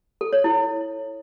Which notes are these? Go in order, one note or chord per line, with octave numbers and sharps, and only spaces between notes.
A4
C#5
E4